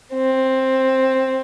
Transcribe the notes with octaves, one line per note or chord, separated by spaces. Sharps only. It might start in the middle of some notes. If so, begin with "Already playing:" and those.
C4